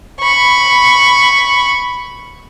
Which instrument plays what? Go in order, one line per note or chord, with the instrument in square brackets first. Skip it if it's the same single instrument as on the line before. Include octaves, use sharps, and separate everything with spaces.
[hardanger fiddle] B5 C#6